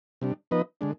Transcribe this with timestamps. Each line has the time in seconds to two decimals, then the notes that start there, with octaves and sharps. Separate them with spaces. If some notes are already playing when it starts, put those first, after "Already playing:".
0.21 C3 G3 D4
0.51 F3 B3 D#4 B4 D#5
0.81 D3 G#3 D4